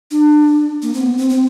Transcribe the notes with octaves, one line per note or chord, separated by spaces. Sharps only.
D4
A#3
C4
B3
C4
C4